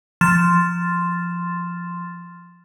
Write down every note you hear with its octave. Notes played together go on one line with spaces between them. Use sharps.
F3 C6 F6 A6 E7